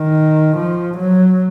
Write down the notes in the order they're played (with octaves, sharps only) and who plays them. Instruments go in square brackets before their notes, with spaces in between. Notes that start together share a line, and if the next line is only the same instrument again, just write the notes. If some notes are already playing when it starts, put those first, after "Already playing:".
Already playing: [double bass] D#3
F3
F#3